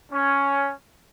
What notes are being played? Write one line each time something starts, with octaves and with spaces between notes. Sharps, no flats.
C#4